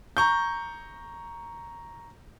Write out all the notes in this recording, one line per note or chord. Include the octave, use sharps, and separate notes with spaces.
A#5 C#6 G6